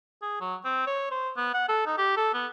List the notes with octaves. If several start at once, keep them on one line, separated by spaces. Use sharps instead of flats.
G#4
F#3
C4
C#5
C5
B3
F#5
A4
D#4
G4
A4
B3